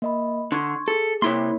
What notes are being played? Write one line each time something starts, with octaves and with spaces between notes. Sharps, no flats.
A#3 D#5 B5
D3 C6 C#6 G#6
G#4 A4
C3 A#3 E4 C#5 C6